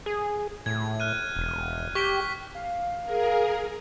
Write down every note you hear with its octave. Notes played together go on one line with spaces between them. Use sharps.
G#4
A2 G#6
F6 F#6 D#7
E1
G4 C#6 B6 G7
F5
G#4 A#4